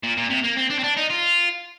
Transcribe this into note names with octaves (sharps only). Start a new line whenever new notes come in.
A#2
A#2
C3
A#3
C4
D4
C4
D4
D#4
F4